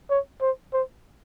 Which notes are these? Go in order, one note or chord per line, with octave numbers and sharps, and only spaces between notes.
C#5
C5
C5